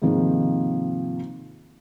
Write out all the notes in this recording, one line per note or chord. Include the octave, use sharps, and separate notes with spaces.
G#2 C3 D#3 F3 A#3 C4